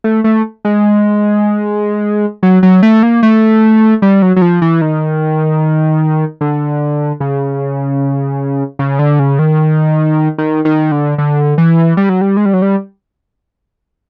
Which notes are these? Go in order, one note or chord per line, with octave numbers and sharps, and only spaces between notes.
A3
A3
G#3
F#3
F#3
A3
A#3
A3
G3
F#3
F#3
F3
E3
D#3
D3
C#3
C#3
D3
C#3
D#3
D#3
D#3
D3
D3
E3
G3
F#3
G3
G#3
G3
F#3
G3